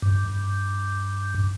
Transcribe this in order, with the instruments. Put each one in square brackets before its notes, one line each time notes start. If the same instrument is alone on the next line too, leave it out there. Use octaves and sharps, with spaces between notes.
[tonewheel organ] G2